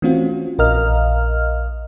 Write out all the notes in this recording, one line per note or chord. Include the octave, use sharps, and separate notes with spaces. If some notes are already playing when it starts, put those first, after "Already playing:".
E3 A3 C4 C#4 F4 F#4
A#1 A#4 D#5 F5 F6